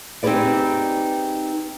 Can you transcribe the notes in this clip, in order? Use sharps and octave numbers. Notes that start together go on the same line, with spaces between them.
C4 D#4 G4 G#4 B4 D5